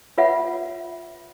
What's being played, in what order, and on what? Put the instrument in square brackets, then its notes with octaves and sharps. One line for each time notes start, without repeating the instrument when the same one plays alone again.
[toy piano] F4 B4 C#5 E5 F#5